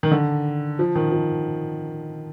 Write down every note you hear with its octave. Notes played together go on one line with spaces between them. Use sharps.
D#3
D3
F3
D#3
F3